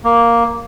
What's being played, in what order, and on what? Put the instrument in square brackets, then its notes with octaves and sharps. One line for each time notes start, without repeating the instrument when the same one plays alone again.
[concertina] A#3